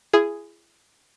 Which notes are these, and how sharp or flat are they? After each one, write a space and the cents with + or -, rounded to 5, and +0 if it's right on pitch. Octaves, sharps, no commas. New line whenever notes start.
E4 +35 G#4 +0